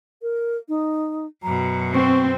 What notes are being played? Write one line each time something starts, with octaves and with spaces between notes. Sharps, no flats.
A#4
D#4
F#2 B2 A#5
C4 C#6